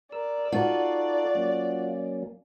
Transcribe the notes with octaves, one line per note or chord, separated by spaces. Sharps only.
A#4 D5 E6
D#4 F4 F#4 A4
F#3 A#3 C#4